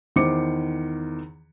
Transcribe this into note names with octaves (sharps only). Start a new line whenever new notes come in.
E2 D#3 C5 D6 C#7